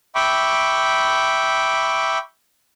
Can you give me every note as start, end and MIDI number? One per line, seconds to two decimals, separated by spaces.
0.15 2.18 76
0.15 2.18 79
0.15 2.18 83
0.15 2.18 85
0.15 2.18 86